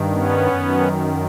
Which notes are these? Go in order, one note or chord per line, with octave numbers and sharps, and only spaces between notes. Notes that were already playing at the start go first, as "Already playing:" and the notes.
Already playing: G2 D#3
B3 C#4
F#2 D#3